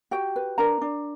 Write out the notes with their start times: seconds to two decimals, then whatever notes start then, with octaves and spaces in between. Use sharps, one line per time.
0.11 F#4 G4 G5
0.36 B4
0.58 D4 A#4 A#5
0.82 D4